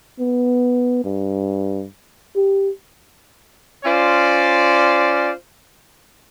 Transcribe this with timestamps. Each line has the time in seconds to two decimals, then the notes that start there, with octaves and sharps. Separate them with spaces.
0.19 B3
1.04 G2
2.36 G4
3.85 C#4 F4 C5 D5